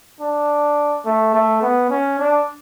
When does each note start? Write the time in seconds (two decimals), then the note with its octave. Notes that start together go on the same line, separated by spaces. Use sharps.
0.21 D4
1.05 A3
1.34 A3
1.62 B3
1.90 C#4
2.19 D4